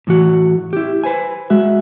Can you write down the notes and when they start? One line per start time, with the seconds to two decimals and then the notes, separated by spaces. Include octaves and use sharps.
0.07 A2 E3 F#4
0.73 E4 G4
1.04 B4 C5 G#5
1.50 G#3 F#4 E5